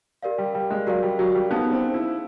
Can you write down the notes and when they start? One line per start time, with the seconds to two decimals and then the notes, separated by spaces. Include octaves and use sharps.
0.23 G4 A#4 D5 F5
0.38 G3
0.54 G3
0.71 G#3
0.87 F#3 G4 A#4 D5 F5
1.03 G3
1.19 F#3
1.35 G3
1.51 B3 D#4 G#4 C5 F5 A5
1.72 C4
1.94 E4